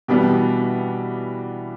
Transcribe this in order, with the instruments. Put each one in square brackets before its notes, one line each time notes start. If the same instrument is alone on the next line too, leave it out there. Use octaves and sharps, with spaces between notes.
[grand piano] B2 [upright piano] E3 G3 B3 D4 G4